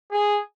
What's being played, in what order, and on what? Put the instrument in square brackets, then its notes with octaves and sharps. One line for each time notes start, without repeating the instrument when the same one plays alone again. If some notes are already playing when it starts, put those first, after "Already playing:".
[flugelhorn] G#4